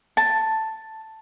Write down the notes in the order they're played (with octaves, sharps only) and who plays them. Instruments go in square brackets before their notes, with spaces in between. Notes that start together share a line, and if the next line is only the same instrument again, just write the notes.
[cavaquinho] A5